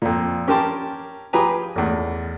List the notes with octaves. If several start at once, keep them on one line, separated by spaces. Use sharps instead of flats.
F2 A#2
C#4 G4 A#4 G5 A5 C6
F3 G4 G#4 B4 G#5 A#5
A1 E2